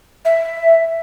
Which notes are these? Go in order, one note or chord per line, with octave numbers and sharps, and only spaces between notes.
E5